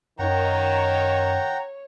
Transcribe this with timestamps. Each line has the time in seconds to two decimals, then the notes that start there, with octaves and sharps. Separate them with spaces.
0.19 F#2 D#3 C#5 F#5 G5 A#5